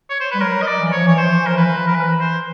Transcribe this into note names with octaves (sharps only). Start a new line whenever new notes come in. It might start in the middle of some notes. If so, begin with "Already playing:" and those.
C#5
C5
G3 B4
F#3 A#4
D#5
D5
E3
F3 C#5
E3 C#5
F3 C5
E3
F3 A#4
B4
E3
F3
A#4
E3 B4
C5